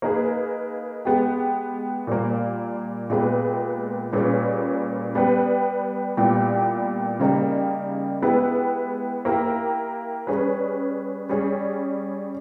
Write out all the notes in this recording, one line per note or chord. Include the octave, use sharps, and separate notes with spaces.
A#3 D#4 G#4 B4
G#3 B3 G4
A#2 G3 A#3
A#2 G#3 B3 G4 B4
A#2 G3 C#4 G#4 B4
G3 B3 G4 B4
A#2 G3 B3 E4 G4
C#3 G3 A#3 D#4 G4
G#3 B3 E4 G4 B4
A#3 E4 G4 A#4
G3 C#4 G#4 B4
G3 C#4 G#4